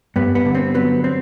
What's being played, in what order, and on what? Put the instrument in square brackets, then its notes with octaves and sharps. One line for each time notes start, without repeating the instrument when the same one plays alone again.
[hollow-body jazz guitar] G2 B3
B3
D3
C4
F#3 B3
C4